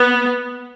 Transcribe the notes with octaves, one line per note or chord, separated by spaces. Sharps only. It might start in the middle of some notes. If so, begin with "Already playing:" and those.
Already playing: B3